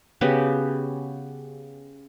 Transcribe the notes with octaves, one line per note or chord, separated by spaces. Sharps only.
C#3 B3 F#4 G4